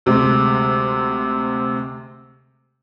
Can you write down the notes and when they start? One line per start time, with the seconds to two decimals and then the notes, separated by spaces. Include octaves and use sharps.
0.06 D2 C3 G#3